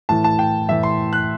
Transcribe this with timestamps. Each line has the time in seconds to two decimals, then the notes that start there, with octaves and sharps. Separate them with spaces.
0.09 A2 E3 A5
0.24 A5
0.39 G5
0.69 A2 E3 E5
0.83 C6
1.13 F#6